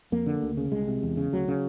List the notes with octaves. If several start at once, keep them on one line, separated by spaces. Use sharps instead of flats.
F2 A#3
D3
D2
C#3
C2 G#3
C3
E2
C#3
D2 F#3
C#3